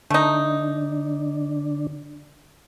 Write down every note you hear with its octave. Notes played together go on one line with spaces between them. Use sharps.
D3 A3 D4 D#4